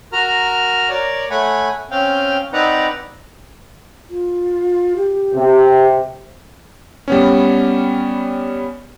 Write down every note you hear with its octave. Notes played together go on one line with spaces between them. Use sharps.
F#4 A#4 A#5 F6
A#4 C#5 D5
A3 C#5 F#5 G#5 B5
C4 C#4 F5 G5
C4 D#4 B4 D5 F#5 A#5
F4
G4
C3
G3 B3 C#4